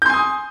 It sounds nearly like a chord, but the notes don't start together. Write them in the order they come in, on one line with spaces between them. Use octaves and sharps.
G6 C6 G#5 D#6